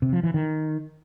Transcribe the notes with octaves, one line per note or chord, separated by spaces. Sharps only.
C3
F3
E3
D#3